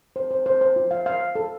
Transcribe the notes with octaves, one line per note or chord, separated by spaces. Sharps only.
C5
C5
C5
C5
F4
F5
F5
F5
A4